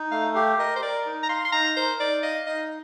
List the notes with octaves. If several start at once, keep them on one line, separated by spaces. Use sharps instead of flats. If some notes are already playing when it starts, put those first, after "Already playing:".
Already playing: D#4
A3 F5
G4 F5
A#4 D#5
C5
A#4 D5
D#4
A#5
F5 C6
C6
D#4 A#5
A#4 C5
D#4 D5
D#5 F5
D#4 D#5